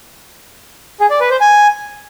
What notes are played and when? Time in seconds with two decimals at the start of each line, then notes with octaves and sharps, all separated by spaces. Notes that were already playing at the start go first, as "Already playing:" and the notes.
1.00 G#4
1.10 D5
1.20 B4
1.30 C5
1.41 G#5